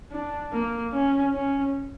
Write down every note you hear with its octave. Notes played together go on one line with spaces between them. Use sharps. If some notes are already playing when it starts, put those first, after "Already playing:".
D4
A#3
C#4
C#4